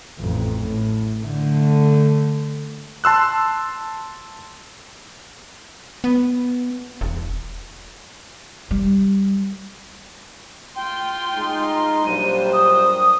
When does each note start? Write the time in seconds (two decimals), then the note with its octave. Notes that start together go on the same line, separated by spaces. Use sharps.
0.20 A1 F2
0.63 A2
1.22 D3 A3
3.04 A5 C6 E6 F#6
6.04 B3
7.01 E1
8.71 G3
10.76 F4 G5 C6
11.36 G#3 D#4
12.06 A#1 F#3 G3 C5 D#7
12.53 D#6